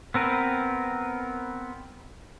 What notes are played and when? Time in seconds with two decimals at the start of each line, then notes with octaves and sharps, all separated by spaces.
0.14 B3 C4 A#4 B4